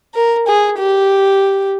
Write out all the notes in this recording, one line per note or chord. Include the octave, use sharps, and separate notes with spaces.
A#4
G#4
G4